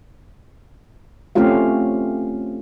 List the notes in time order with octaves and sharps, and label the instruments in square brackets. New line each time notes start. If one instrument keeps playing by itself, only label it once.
[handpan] A3 C4 C#4 F4 G4 F5